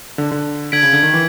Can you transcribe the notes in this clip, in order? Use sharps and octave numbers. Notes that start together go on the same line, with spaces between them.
D3
D3
D3 G#6 B6 D7 F#7
C#3
D3
D#3
E3